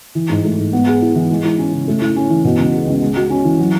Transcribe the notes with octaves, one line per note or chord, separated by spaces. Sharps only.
E3
G#2
A3
G#2
B3
G#4
E4
E3
G#3
E4
C#4
C#3
A3
E4
C#4
E3
B2
C#2
G#3
C#2
G#3
F#4
C#4
E3
F#3